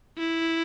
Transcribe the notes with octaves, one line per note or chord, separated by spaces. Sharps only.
E4